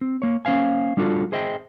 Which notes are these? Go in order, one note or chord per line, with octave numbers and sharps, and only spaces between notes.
C4
A#3 C#5
A#3 C#4 C5 F5 G#5
G3 D4 F4 F#4 A4
G#4 C5 D#5 E5 G5